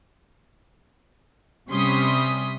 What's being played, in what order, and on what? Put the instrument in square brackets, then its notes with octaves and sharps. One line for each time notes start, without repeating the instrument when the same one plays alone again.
[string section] C3 G3 C#4 C6 D#6 B6